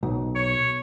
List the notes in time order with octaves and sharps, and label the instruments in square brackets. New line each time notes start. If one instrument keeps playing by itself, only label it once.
[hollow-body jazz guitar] B1
[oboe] C#5